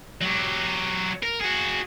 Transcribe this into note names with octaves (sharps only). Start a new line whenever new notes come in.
F#3 G4
A#4
F#4 G#4